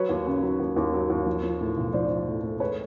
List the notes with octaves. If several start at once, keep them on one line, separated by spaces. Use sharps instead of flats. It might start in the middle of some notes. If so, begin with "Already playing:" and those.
Already playing: F#3 B4 C#5
D#2
C#3
F#3
D#2
D#2
F#3
D#2
F3
F3
A2
B1
F3 C5 D5
F3
A2
A3
G#3 B4 C#5